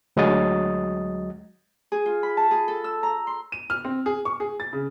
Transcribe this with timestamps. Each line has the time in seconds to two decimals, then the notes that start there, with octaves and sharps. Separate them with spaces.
0.16 D2 F#3 G#3 D#5 D#6 A6
1.92 G#4
2.06 F4
2.23 B5
2.37 A5
2.51 G#4
2.68 A4
2.84 E6
3.03 A#5
3.27 C6
3.52 D#7
3.70 F6
3.85 C4
4.06 G#4
4.25 C#6
4.40 G#4
4.60 A6
4.73 C#3